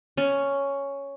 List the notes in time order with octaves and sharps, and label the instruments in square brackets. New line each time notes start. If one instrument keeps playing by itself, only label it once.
[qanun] C#4